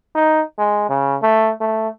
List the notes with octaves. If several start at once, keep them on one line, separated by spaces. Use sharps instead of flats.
D#4
G#3
C#3
A3
A3